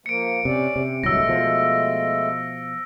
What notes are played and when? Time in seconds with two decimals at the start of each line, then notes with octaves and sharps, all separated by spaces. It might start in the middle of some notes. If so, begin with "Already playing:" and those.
0.06 F3 A#3 C#7 D7
0.45 C3 C#4 D5
0.76 C3
1.04 D1 C2 F#3 G#3 A3 E6 A#6
1.27 B2 F3